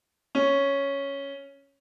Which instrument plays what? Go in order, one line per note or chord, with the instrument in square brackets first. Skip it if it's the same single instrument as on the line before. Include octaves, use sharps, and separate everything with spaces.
[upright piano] C#4